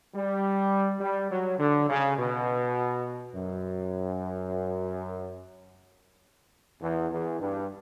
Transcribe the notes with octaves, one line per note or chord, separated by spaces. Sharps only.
G3
G3
F#3
D3
C#3
B2
F#2
E2
E2
G2